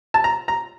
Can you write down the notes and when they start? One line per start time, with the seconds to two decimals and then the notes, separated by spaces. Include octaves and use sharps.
0.14 A5
0.24 A#5
0.48 A#5